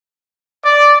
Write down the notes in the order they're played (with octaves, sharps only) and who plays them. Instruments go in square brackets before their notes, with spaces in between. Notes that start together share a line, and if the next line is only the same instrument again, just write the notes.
[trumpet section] D5